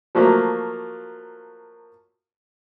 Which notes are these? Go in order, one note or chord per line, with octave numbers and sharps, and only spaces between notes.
F3 F#3 A3 A#3